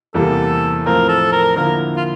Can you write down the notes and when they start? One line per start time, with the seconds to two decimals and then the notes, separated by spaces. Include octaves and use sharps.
0.14 E2 C3 E3 G3 A#3 A4
0.85 A2 F3 C4 A#4
1.09 A4
1.32 A#4
1.56 D3 F3 A#3 E4 A#4
1.96 F4